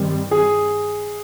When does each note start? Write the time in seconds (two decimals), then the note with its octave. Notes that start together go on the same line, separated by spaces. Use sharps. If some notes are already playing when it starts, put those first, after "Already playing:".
Already playing: G2 D#3 G3 C4
0.31 G#4